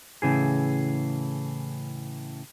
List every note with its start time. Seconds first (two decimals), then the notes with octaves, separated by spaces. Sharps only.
0.22 A2 C#3 E3 G#4